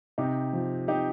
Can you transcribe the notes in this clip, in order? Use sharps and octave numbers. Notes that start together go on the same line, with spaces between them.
C3 D#4 G4
F3
C3 D#4 G4